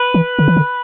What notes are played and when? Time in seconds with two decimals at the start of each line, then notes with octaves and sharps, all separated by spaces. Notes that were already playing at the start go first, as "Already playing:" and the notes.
Already playing: B4
0.14 E3
0.39 D3
0.48 E3
0.57 D3